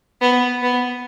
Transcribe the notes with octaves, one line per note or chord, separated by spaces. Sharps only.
B3
B3